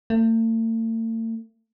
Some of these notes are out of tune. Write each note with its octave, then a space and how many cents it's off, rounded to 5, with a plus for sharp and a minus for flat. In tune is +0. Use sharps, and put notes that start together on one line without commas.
A3 +45